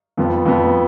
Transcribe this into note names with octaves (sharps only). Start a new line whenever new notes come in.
F2 F3 B3
F2 F3 B3